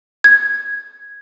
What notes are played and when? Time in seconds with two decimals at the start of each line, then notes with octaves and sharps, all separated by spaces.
0.24 G#6